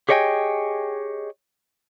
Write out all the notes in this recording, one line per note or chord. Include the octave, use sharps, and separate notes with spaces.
G4 G#4 C#5 D#5 G5 G#5